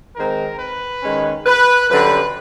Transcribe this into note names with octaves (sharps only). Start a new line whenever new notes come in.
D#3 G#3 C4 A#4
B4
D#3 G#3 C#4
B4
F#2 D3 G3 B4